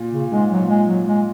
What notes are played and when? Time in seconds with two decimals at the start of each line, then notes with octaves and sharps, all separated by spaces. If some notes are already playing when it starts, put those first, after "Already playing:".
Already playing: A#2
0.12 C#3
0.31 G#2 G#3
0.51 F#3
0.60 A#2
0.69 G#3
0.88 F#3
1.07 G#3